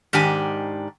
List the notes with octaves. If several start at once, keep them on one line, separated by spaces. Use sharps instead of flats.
G#2 D#3 D4 G4 G#5